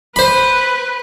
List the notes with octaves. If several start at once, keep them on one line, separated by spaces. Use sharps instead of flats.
B4 C5 B5